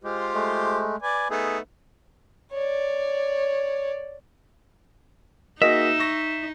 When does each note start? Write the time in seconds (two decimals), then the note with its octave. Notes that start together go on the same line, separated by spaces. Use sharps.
0.04 G#3 F4 G4 C5
0.34 G#3 A3
1.02 B4 D5 G#5
1.30 A3 B3 D#4 G#4
2.52 C#5 D5
5.62 A#3 D#4 F#4 G#4 D#5 E5
5.99 C#6 A#6